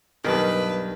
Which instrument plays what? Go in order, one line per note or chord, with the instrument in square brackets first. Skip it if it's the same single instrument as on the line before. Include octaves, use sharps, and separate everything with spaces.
[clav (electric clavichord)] B1 G2 [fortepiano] D#3 A5 [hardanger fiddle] B4